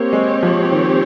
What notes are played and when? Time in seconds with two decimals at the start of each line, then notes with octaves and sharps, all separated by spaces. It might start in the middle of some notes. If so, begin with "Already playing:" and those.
Already playing: A#3 C4 G4 C#5
0.13 G#3
0.43 F3
0.72 D#3